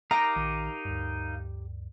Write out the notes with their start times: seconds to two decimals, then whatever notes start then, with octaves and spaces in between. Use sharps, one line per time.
0.11 D#4 G4 A#4 F5 A#5
0.36 A#1 D#3
0.85 D2 G2